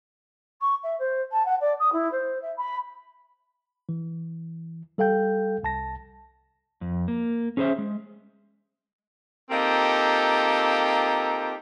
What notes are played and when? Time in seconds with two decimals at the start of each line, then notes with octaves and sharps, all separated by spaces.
0.61 C#6
0.83 E5
0.99 C5
1.31 A5
1.45 F#5
1.60 D5
1.79 D#6
1.92 E4
2.11 C5
2.41 E5
2.57 B5
3.89 E3
4.98 G3 A4 F5 G5 G6
5.63 C2 A5 A#6
6.81 F2
7.08 A#3
7.57 C#4 G#4 B4 C5 E5
7.78 G#3
9.50 A#3 C4 D#4 F4 G4 A4